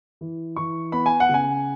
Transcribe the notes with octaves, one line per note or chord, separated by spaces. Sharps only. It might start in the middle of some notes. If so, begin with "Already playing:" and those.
E3
E3 C#6
B3 B5
G#5
F#5
C#3 G#5